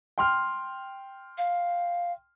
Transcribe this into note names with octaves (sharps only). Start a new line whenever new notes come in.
G5 C6 F6
F5